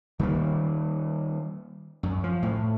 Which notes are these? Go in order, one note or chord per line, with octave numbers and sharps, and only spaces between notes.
D#3 G3 G#3 A#3
F#2
F3
A2